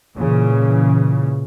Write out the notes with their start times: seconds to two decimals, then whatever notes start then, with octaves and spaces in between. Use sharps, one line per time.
0.16 A#2 C#3 E3